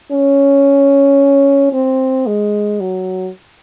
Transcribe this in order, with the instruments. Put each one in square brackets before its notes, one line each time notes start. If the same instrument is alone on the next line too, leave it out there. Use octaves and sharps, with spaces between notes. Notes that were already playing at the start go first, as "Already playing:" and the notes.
[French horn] C#4
C4
G#3
F#3